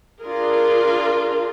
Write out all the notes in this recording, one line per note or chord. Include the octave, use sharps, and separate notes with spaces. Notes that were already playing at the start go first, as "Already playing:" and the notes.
D4 F4 G#4 A#4